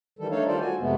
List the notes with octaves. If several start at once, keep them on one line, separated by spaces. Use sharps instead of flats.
D#3 E3 G3 A4
A3 D4 D#4 A4 C#5 F5
D#3 G3 F4 A4 C5 D5
F#4 G#5
F2 C3 G#3 A3 B3